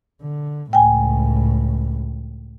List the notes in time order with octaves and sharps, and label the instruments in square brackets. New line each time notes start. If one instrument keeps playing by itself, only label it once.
[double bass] D3
[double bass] C#2 A2 [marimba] G5 G#5